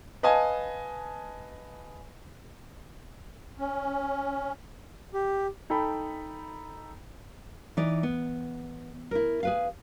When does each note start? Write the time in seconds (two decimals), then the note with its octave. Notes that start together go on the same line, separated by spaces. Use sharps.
0.23 B4 D#5 F5 G#5 A5
3.58 C#4
5.14 G4
5.70 D#4 A4 G5 B5
7.77 E3 D#4 D5
8.03 B3
9.11 E4 A#4
9.43 G#4 B4 F5